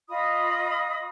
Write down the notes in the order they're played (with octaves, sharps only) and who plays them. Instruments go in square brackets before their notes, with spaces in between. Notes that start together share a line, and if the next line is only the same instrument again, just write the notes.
[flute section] F4 D#5 B5 D#6